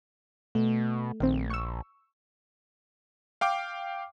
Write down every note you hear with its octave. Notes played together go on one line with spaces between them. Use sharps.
B2 A3
A#1 D#3 C4
C#6 E6
F5 G5 D6